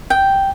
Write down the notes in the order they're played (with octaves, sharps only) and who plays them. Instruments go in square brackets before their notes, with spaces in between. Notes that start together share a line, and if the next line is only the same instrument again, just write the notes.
[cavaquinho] G5